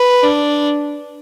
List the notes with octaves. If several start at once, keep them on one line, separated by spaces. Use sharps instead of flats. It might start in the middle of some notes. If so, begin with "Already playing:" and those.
Already playing: B4
D4